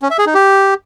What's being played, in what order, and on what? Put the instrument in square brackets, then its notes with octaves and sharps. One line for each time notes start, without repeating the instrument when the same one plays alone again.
[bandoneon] C#4
E5
G#4
D#4
G4